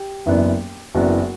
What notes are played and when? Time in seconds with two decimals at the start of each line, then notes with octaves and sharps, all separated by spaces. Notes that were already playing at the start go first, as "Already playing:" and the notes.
Already playing: G4
0.26 F#1 F#2 E3 B3 D4
0.95 F#1 F#2 E3 B3 D4 F#4